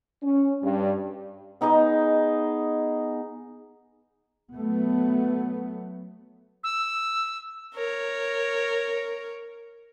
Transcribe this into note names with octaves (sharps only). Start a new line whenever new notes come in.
C#4
G2
B3 D#4 G#4 D#5
F#3 A3 B3
E6
A#4 C#5